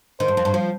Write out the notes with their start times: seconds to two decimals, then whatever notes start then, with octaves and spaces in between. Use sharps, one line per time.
0.20 D#3 C5
0.28 G2
0.37 F2
0.45 G2
0.54 F3